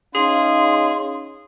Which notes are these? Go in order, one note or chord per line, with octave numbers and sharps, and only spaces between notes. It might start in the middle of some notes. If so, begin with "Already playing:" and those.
C#4 D#4 G#4 F5 C6